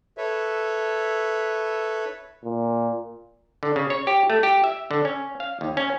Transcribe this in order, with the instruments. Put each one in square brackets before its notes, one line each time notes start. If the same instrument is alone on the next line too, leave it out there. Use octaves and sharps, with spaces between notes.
[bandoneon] A4 B4 C#5 E5
[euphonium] A#2
[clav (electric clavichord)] D3
C#3
C#5
G4
A3
G4
E5
D3
C#4
F5
D#2
C#4